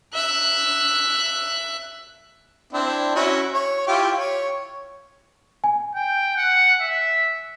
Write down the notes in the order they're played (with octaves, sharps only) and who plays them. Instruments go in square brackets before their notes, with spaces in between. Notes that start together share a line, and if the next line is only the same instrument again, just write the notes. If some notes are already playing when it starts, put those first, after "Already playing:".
[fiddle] E5 F#6
[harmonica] C4 D4 E4
C#4 E4 F#4
C#5
E4 F4 G4
C#5
[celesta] G#5
[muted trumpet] G5
F#5
E5